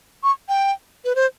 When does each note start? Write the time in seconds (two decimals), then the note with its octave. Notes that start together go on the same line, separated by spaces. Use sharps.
0.24 C#6
0.49 G5
1.05 B4
1.15 C5